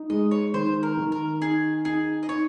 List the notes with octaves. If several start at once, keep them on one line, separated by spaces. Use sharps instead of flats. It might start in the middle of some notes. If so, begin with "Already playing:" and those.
Already playing: D#4
G#3 D#5
C#5
D#3 C5
A#4
D#3
A#4
D#4 G#4
D#4 G#4
D#5
D#4 C#5